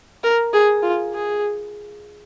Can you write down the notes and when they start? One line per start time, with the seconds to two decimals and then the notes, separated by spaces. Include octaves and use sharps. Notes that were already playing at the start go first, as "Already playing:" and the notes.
0.24 A#4
0.53 G#4
0.83 F4
1.14 G#4